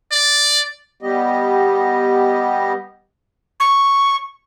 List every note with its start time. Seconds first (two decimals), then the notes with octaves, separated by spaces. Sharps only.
0.12 D5
1.03 G3 B3 G4 D#5
3.60 C#6